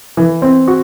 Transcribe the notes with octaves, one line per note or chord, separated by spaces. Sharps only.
E3
C4
F#4